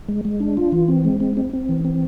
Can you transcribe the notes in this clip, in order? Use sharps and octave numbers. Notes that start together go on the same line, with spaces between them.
G#3
G#3
D4
F4
E3
C4
G#3
C4
C4
C4
E3
C4